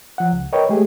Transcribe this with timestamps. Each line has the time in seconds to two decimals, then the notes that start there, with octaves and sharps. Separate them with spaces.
0.18 F3 F#5
0.32 C#2
0.53 A#4 B4 C#5 D#5 G5
0.69 G#3 A3 G4 G#4